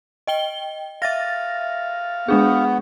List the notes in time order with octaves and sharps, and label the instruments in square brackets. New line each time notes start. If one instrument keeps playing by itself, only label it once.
[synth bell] D#5 G5 G7
[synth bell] E5 A6 A#6 [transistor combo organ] F5
[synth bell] G#3 D4 G#4 [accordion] B3